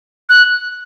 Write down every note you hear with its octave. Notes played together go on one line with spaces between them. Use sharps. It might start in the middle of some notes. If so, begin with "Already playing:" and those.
F#6